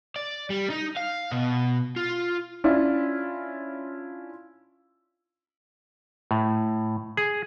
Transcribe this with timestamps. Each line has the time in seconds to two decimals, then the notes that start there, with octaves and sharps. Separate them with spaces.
0.16 D5
0.50 G3
0.70 D#4
0.96 F5
1.32 B2
1.96 F4
2.64 C#4 D4 E4 F4
6.31 A2
7.17 G#4